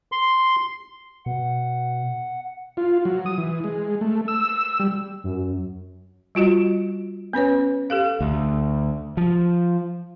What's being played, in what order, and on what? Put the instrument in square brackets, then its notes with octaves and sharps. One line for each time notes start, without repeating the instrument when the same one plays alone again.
[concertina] C6
[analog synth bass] B2 [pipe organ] F#5
[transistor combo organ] F4
F#3
D#6
E3
G#3
A3
E6
G3
[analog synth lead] F#2
[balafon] G3 F4 F#4 D#5
B3 C#4 B4 C#5
G4 A4 F5
[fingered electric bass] D2
F3